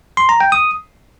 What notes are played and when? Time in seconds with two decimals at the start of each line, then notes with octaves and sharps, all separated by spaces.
0.17 C6
0.29 A#5
0.41 G5
0.52 D#6